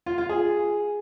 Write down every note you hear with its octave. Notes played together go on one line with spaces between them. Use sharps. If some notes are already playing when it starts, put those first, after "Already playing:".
F4
F4
G#4